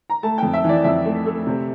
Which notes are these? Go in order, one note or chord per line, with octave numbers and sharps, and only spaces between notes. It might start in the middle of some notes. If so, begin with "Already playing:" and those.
A#5
A3 A5
F2 G5
E5
E3
D5
F2 E5
A3
A3
C3